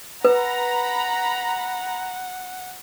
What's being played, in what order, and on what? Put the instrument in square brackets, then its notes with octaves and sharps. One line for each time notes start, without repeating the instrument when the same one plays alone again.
[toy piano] B4 [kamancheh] F#5 [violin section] A#5 B5